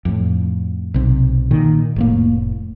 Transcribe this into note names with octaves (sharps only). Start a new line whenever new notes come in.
F2 A2
B1 C3
A#2 D#3
F1 A2 A#3